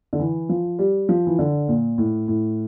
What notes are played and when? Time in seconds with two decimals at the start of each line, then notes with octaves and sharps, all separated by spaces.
0.13 D3
0.19 E3
0.49 F3
0.79 G3
1.09 F3
1.27 E3
1.39 D3
1.68 A#2
1.98 A2
2.28 A2